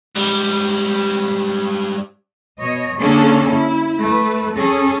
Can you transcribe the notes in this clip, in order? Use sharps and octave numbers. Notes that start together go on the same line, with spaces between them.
G#2 G3
B2 C#5 D#5
D3 A#3 C#4 D4 G#4 A4
E4
A3 B4
C#4 G#4 A4